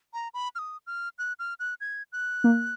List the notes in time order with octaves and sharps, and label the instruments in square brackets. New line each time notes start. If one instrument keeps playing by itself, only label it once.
[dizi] A#5
B5
F6
D#6
F6
F#6
F6
F#6
G#6
F#6
[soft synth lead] A#3